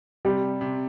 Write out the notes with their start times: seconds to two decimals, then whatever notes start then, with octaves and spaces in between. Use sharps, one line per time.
0.25 C3 G3 G4
0.61 C3